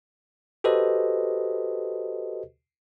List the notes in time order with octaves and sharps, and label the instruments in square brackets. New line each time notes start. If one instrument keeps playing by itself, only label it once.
[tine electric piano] F#4 G4 A4 B4 C5 D#5